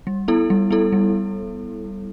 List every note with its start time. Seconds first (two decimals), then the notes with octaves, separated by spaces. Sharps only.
0.07 G3
0.28 B3 E4 A4
0.50 G3
0.71 B3 E4 A4
0.93 G3